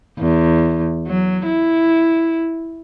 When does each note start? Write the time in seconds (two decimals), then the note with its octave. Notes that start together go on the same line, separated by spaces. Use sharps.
0.19 E2
1.07 F#3
1.46 E4